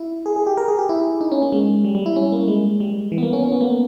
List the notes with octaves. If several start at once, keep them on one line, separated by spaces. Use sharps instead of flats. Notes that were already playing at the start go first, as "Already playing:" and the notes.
Already playing: E4
G#4
G#4
G4
A#4
G#4
G4
E4
D#4
C#4
A#3
G#3
G3
G3
E4
C#4
A#3
G#3
G3
E3
B3
A#3
C#4
C#4
B3
A#3
B3